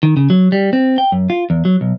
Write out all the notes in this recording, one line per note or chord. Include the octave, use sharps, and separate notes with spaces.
D#3
C#3
F#3
G3
C4
G5
F#2
F4
E2
F#3
B1